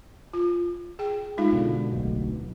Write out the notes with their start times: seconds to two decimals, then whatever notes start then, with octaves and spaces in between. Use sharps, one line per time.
0.33 F4
0.99 G#4 G5
1.38 G#3 D#4 F4
1.53 B2 D3
1.92 D1 B1 B2